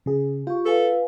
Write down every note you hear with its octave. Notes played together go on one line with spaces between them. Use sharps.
C#3 G#4
F4 G4 C#6
A4 B4 F5 G#5